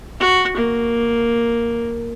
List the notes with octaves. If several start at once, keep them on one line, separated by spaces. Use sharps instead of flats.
F#4
A#3